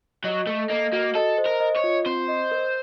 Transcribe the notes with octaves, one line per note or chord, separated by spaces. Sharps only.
F#3 D#5
A3 A4
A#3 D#5
A#3 F#4
A4 D#5
C5
A#4
D#5
C#5
F4
C4 C5
D#5
A#4